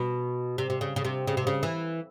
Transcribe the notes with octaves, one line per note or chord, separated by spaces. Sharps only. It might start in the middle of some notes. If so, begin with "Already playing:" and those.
Already playing: B2
C3
C3
C#3
C#3
C3
C#3
C3
C#3
E3